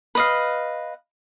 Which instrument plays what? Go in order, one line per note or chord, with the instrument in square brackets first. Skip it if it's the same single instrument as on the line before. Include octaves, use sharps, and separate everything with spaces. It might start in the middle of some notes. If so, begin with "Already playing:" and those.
[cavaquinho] B4 D#5 F5